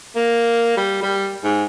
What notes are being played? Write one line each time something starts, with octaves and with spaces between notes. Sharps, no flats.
A#3
G3
G3
G#2